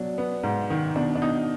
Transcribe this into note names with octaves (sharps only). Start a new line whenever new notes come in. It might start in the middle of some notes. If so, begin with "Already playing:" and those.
Already playing: B2 F#3 D4
B3
G#2
D#3
B2 D4
D4
B2 D#4